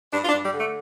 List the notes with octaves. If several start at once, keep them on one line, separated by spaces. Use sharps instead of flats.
G2 D4
F4
D4
G2
G3
D3
A3